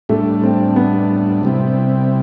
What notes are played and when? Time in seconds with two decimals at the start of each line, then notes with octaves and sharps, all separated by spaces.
0.09 A2 G3 A3 D4
0.43 C4
0.76 B3
1.43 C3 G3 C4 E4